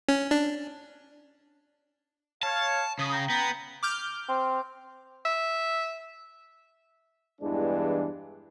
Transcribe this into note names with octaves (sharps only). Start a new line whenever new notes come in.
C#4
D4
C#5 F5 A5
C#3 D#6
G5 A#5
B3
D6 F6 G6
C4
E5
E2 G2 E3 G#3 D4